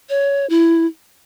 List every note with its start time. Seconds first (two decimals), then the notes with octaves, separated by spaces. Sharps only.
0.09 C#5
0.50 E4